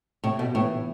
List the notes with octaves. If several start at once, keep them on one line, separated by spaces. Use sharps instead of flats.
A2 C3
B2
A2 E3 B3 E4 B4